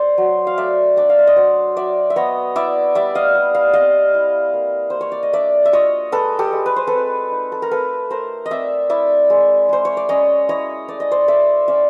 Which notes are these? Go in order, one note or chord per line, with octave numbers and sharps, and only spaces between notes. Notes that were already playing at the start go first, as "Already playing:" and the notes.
Already playing: C5 D5
F#3
F5
A3 D5 E5
D4 D5 E5
F5
E5
D#5
F#3 C5 D5
F#3 D5 E5
E5
B3 C#5 D#5
E4 D5 E5
G3 D5 E5
D#5 F5
G3
F5
C4 D#5 F5
E4
A#3
A#3 C5
C#5
D5
D#5
D4 D5 E5
E5
F4 C#5 D#5
G#3 A4 B4
G4 A4
G#3
B4
C5
C4 A4 B4
D#4
A4
A#4
A3 A4 B4
A3 A#4 C5
D#5
C4 D5 E5
E4 D5 E5
G#3
G#3 C5
C#5
D5
C#4 C#5 D#5
E4 C#5 D#5
A3 D5
D#5
C5 D5
A3 D5 E5
C#4 D5 E5